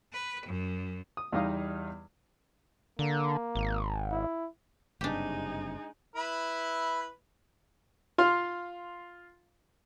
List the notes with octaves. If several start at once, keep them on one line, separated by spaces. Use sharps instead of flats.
B4
F#2
D#6
E2 G3 D#4 D#5 F5 D#6
D3 A#3
G#1
E4
F#1 G2 C3 G#3 D4 D#4 G4
E4 B4 B5
F4 F5 C6